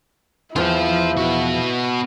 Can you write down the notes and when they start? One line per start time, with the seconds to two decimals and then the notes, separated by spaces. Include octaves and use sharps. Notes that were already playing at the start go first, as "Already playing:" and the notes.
0.56 E2 F3 E4 F4 C5
1.17 B3 F#4